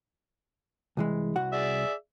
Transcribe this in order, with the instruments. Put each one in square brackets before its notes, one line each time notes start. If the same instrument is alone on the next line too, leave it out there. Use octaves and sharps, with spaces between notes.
[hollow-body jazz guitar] C2 E3 G#3
C2 F#4 F#5
[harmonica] G#4 D5 E5